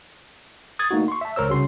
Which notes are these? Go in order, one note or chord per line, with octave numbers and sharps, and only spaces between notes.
D#6 G#6 A6
A3 A#3 D#4 F#4
C6 C#6
E5 A5
C#2 A#4 C5 C#5 E6
C2 C#3 C#4 F#4 C6